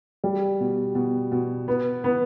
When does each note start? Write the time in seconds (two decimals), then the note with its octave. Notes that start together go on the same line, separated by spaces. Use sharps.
0.24 G3
0.60 B2
0.95 B2
1.32 B2
1.68 B3
2.04 B3